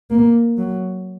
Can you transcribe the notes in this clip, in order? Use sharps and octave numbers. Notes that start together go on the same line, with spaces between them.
A#3
F#3